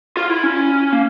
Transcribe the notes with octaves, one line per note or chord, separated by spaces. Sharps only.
F4
E4
C#4
A#3